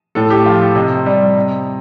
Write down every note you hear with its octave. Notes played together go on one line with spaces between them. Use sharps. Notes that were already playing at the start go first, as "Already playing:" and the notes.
A2 A4
G4
F3 F4
G4
C3 D#5
G3
C3